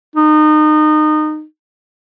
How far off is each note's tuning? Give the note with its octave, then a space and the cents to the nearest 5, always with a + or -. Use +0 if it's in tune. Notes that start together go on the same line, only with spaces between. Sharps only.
D#4 -25